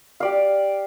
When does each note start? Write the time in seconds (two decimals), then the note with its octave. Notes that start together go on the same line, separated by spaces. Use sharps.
0.20 G4 D5 F5